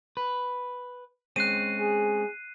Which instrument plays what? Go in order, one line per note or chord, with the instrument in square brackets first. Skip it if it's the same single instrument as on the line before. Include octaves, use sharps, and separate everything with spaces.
[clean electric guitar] B4
[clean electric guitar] G#3 C4 C#4 [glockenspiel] F#6 C7 D#7
[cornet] G#4